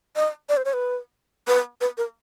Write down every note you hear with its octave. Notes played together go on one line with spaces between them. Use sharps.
D#5
D5
C5
C#5
B4
B4
B4
A#4